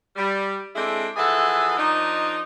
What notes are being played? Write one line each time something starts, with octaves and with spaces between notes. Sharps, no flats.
G3
G#3 C4 D4 E4 G#4 A4
E3 F3 G#4 A4 E5 F#5
D#3 F3 D4 D#4